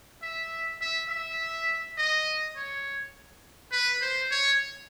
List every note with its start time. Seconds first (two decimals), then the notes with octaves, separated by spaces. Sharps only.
0.22 E5
0.81 E5
1.09 E5
1.98 D#5
2.56 C#5
3.72 B4
4.02 C5
4.31 C#5